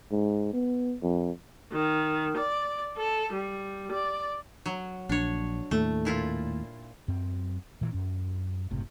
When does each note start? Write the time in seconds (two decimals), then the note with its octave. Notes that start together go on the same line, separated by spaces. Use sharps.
0.12 G#2
0.54 B3
1.03 F2
1.72 D#3
2.37 D5
2.97 A4
3.33 G3
3.92 D5
4.66 F#3
5.09 A#1 D4 C#5
5.71 D#2 A2 A3
6.05 A#2 E4 F4
7.08 F#2 C4
7.81 A#2 E3
7.93 F#2 C#4
8.71 F#1 A2 C3